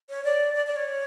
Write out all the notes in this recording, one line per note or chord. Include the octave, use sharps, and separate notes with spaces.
C#5
D5
D5
D5
C#5